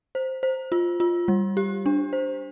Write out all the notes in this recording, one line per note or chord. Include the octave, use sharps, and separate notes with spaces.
C5
C5
F4
F4
G3
G4
D4
C5